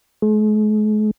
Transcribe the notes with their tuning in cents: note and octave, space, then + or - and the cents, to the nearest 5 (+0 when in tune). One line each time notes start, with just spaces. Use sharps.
G#3 +45